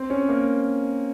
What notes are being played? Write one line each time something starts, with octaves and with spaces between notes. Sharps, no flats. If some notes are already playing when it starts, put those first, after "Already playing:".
Already playing: C4
C#4
A#3